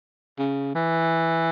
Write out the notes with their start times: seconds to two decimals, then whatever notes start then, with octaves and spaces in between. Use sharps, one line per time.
0.39 C#3
0.75 E3